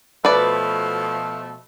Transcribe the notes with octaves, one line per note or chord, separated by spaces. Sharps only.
B2 F3 A3 B4 D5